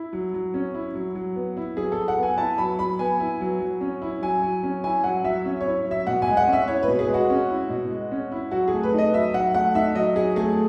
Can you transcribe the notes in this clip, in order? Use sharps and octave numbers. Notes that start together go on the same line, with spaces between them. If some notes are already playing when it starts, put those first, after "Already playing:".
Already playing: E4
F#3
F#3
C#4
E4
F#3
F#3
B3
E4
F#3 G#4
A4
F#3
F#5
B3 G#5
E4 A5
F#3 B5
F#3 B5
B3 G#5
E4
F#3
F#3
C#4
E4
F#3 G#5
F#3
C#4
E4 G#5
F#3 F#5
F#3 E5
C#4
E4 C#5
F#3
E5
B2 F#5
G#5
G#3
F#5
C#4
E5
E4 C#5
B4
B2
G#4
G#3
F#4
C#4
E4
B2
G#3
C#4
E4
F#3 F#4
G#4
A3
B4
D#4
D#5
F#3 E5
F#3 F#5
A3 F#5
D#4 E5
F#3 D#5
F#3 G#4
A3 G#4